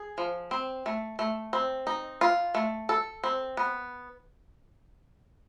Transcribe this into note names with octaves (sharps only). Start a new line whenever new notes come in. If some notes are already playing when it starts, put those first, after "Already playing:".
Already playing: G#4
F3
C4
A3
A3
C4
D#4
F4
A3
A4
C4
B3